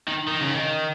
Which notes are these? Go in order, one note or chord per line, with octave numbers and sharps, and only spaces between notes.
D#3
D#3
C#3
D#3